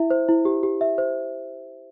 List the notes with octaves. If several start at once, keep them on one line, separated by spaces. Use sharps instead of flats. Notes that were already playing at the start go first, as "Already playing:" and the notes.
Already playing: E4 E5
C5
E4
G4
G4
E5
C5